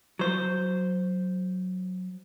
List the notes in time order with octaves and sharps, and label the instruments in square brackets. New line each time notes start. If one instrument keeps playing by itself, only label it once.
[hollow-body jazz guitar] F#3 C5